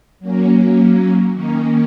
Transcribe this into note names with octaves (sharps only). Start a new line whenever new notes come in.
F#3 A#3 C#4
D#3 A#3 C#4